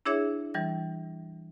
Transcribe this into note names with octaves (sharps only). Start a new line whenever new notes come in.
D4 E4 G#4 C#5 E5
E3 G3 A6